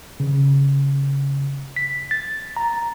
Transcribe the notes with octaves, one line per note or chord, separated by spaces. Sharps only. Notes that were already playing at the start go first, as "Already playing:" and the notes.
C#3
B6
A6
A#5